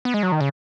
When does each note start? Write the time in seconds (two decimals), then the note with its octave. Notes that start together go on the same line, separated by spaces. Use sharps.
0.05 B3
0.14 G#3
0.23 F#3
0.32 D#3
0.41 C#3